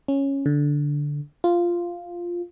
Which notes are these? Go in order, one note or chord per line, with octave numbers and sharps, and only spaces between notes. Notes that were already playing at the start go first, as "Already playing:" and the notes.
C#4
D3
F4